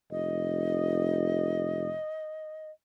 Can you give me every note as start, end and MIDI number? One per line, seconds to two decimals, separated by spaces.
0.11 1.94 29
0.11 2.71 75